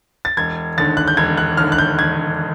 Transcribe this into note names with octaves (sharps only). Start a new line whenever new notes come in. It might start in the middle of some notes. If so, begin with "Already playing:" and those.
A6
E1 G#6
D#2 D3 A6
F#6
G6
E1 G#6
F#6
D#2 D3 F6
F#6
G6
E1 G#6